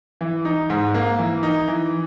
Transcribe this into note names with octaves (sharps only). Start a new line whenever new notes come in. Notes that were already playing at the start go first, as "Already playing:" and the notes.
E3
D#4
G#2
A#3
E3
D#4
E3